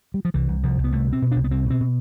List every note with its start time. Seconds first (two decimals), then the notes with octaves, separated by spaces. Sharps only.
0.14 G3
0.25 F3
0.34 C2 E3
0.48 C2
0.63 C2 F3
0.78 C2
0.84 B3
0.92 C2 A3
1.08 B2 C4
1.22 B2
1.31 C2 D4
1.44 B3
1.51 C2 C4
1.65 B2
1.70 C4
1.81 B2